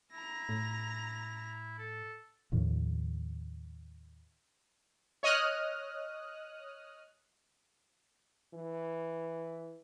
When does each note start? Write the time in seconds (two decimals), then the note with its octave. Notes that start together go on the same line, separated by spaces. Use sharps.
0.12 E4 A#5 A#6
0.49 A2
1.78 A4
2.52 D#2 A2 D#3 F3
5.23 C#5 D#5 D#6 F6 F#6
8.54 E3